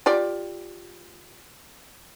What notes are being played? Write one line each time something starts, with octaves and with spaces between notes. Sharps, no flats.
F4 G4 D5